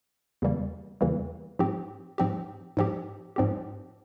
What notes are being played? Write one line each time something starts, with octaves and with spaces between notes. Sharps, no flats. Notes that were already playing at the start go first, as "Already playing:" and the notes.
E2 C#3 E3 G3 A#3
E2 C#3 E3 G3 A#3
G#2 F3 C4 G4
G#2 F3 C4 G4
G#2 F3 C4 G4
G#2 F3 C4 G4